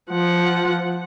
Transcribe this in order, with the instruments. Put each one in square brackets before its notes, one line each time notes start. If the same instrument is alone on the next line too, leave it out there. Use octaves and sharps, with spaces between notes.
[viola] F3 F#5